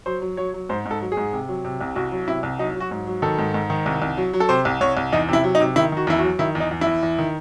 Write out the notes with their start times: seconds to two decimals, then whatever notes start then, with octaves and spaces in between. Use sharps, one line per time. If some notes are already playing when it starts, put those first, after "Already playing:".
0.06 F#3 C5
0.22 F#3
0.37 F#3 C#5
0.54 F#3
0.69 G#2 C5
0.85 G#2
0.91 A4
1.01 F#3
1.12 G#4
1.17 G#2
1.33 C3
1.48 F#3
1.65 C3
1.81 C2
1.95 C2 F#4
2.12 F#3
2.28 C3 E4
2.43 C2
2.59 F#3 D#4
2.75 F#3
2.80 F#4
2.91 G#2
3.07 F#3
3.22 D#3 A4
3.38 G#2
3.54 G#2
3.70 D#3
3.86 C2
4.02 C2
4.17 F#3
4.33 F#3
4.40 A4
4.49 C3 C5
4.65 C2
4.81 C2 C#5
4.97 C2
5.12 E2 D#4
5.29 C3 E4
5.44 F#3
5.55 D#4
5.60 C3
5.76 D#3 E4
5.92 D#3 F#4
6.07 E2 E4
6.19 F#4
6.23 F#3
6.39 D#3 E4
6.55 E2
6.60 D#4
6.71 E2
6.81 E4
6.86 E2
7.03 E2
7.18 D#3